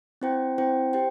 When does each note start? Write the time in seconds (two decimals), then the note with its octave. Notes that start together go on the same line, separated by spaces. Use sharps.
0.21 C4 E4 C5 G5
0.58 C4 E4 C5 G5
0.93 G4 C5 G5